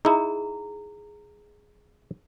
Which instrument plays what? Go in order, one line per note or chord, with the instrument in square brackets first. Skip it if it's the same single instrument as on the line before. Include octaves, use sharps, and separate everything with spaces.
[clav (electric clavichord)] D#4 E4 [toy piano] G#4 A#5